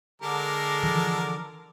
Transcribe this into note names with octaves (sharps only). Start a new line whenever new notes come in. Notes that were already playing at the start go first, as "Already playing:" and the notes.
D3 G#3 A4 A#4 D6
E3 F3